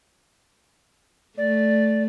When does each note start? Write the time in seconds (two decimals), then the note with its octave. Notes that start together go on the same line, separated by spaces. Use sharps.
1.38 A3 D5